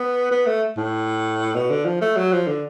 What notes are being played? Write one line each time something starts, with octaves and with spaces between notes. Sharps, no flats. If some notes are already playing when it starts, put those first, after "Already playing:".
Already playing: B3
B3
A3
A2
B2
D3
F3
A3
F#3
F3
D3